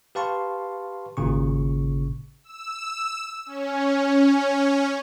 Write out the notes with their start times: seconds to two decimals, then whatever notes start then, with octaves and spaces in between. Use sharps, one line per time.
0.15 G4 B4 F5 A5 C6 C#6
1.17 G#1 A#2 C#3 C#6
2.44 E6
3.46 C#4